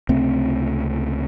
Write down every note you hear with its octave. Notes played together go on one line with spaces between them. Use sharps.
C#2 C3 A3 C4